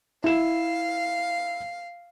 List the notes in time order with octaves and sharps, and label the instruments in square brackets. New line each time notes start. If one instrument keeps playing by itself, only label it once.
[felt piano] E4 E7 [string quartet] F5